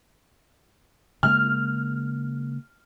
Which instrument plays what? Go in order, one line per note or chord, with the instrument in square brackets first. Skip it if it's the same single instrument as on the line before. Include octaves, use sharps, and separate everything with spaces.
[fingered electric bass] C#3 G#3 A#3 [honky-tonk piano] F6